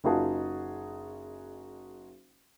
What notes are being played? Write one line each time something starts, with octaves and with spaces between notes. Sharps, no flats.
F#1 D#4 F4 F#4 G#4 A5